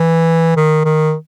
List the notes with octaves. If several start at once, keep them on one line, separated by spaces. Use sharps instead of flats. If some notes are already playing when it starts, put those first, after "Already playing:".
Already playing: E3
D#3
D#3